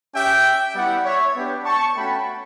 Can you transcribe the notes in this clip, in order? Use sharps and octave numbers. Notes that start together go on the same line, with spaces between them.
C#4 G4 E5 G5
G3 B3 E4 G4 D5 F#5
C#5 E5
B3 D4 G4
A5 C#6
A3 C#4 F#4 G5 B5